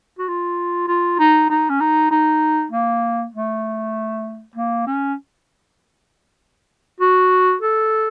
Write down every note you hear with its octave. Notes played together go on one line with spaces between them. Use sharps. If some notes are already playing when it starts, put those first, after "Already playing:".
F#4
F4
F4
D#4
D#4
C#4
D#4
D#4
A#3
A3
A#3
C#4
F#4
A4